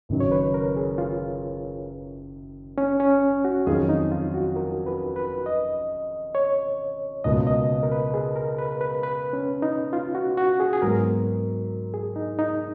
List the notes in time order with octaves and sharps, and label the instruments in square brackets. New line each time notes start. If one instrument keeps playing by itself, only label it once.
[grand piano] F#1 F#2 D#3 F#3
[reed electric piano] C#5
B4
A#4
G#4
F4
C#4
C#4
F#4
[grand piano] F2 D#3 F#3 C#4 G#4 [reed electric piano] F4
[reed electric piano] D#4
F4
F#4
A#4
B4
B4
D#5
C#5
[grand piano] C#2 B2 A#3 [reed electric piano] D#5
[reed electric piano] D#5
A#4
B4
G#4
A#4
B4
B4
B4
C#4
D#4
F4
F#4
F#4
G#4
G#4
[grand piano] G#2 F#3 B3 [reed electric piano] A#4
[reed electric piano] G#4
D#4
D#4